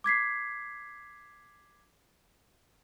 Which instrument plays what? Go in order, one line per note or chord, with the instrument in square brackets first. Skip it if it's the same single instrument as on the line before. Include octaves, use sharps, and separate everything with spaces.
[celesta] D6 G#6 B6 C7